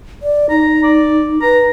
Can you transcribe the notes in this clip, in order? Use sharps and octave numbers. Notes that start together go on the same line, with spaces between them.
D5
D#4 A#5
D5
B4 A#5